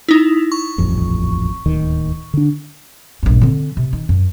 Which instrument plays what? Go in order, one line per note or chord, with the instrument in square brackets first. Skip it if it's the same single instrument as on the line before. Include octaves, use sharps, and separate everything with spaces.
[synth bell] D#4 E4
C#6
[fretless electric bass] D#1 A1 F2
D1 D#2 D#3
D3 D4
[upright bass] A#1 G2
D3 C4
C3
D#3
F#2